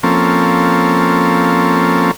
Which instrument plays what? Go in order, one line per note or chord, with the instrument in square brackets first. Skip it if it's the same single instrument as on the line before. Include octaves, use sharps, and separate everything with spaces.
[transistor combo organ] F3 A#3 C4 C#4 A4